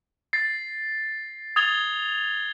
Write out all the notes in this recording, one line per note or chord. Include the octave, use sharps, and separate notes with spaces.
A6 C7
D#6 G#6 A6 F7 G7